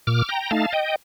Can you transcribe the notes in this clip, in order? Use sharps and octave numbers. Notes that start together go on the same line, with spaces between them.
A#2 D6 F6
G5 A#5
A3 D#4 F5 A5
D#5 G5